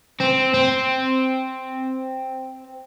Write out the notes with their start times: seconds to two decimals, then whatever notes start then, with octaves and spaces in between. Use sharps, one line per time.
0.21 C4
0.54 C4